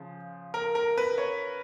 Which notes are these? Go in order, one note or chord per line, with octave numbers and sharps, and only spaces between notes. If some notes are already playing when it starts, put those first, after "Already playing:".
Already playing: C#3 F3
A#4
A#4
B4
C#5